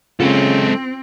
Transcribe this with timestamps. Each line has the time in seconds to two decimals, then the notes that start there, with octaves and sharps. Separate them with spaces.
0.20 C#3 G#3 C4 C#4 F4 A4